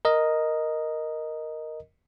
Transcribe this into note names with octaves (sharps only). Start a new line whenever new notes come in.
A#4 D#5